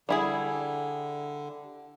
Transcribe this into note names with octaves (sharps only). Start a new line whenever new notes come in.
D3 G3 E4 G#4